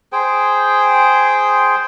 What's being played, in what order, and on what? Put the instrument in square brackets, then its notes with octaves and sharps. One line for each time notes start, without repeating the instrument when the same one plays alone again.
[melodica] G#4 C5 G5